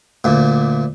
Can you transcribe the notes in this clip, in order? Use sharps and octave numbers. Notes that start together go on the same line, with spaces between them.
D2 A#2